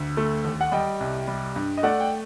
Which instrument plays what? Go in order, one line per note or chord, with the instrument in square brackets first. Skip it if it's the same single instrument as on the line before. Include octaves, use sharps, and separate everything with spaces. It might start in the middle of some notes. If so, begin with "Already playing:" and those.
Already playing: [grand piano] D2
A3
D#2
F#5
G3 D#5 G5
C2
G3
G2
D#5
A3 D5 F#5
G5